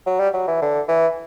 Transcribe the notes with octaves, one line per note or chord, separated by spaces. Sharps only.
F#3
G3
F#3
E3
D3
E3